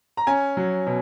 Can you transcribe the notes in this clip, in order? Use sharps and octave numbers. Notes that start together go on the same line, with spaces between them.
A#5
C#4 G#5
F#3
B2